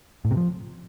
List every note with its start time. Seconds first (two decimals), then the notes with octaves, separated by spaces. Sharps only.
0.25 A2
0.31 C3
0.37 F3